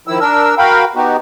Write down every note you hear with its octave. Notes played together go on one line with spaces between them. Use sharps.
D#3 F3 E4 E6
D4 A#4 E6
F#4 A#4 F5 G5 B5
B3 D#4 F#4 G4